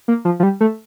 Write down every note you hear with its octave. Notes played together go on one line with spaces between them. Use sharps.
A#3
F3
F3
G3
A3